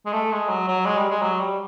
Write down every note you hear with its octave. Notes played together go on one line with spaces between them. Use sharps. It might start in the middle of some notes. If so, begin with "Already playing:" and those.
G#3
A3
G#3
F#3
F#3
G#3
G3
G#3
F#3
G3